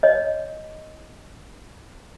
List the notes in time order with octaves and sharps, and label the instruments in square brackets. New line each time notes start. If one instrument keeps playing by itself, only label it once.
[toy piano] C#5 D#5